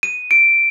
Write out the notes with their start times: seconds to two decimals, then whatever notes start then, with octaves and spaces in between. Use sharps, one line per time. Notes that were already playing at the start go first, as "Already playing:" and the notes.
0.03 D#7
0.31 D7